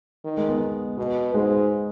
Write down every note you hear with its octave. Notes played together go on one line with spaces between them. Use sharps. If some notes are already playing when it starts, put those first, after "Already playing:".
D#3
G#3
B3
B2
G#2 G#3